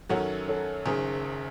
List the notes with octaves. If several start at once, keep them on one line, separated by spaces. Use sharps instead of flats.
F#2 D#3 F#3 C#4 F#4 A4 C#5
A4 C#5
F#1 F#2 D#3 G#4 C5